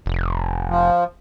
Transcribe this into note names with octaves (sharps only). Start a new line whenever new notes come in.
F1
F3